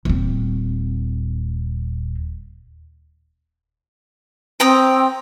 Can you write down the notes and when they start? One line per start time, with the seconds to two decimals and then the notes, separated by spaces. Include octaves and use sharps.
0.05 D#1 C4
4.60 C4 G5 A#5 D#6